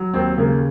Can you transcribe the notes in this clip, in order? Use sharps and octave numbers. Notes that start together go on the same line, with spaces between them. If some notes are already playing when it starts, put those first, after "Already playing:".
Already playing: F#3
D#2 C4
C#3 A#3